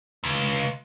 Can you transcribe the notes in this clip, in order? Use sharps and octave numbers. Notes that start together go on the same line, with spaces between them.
C#2